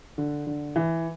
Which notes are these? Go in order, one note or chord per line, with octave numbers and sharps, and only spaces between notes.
D3
D3
E3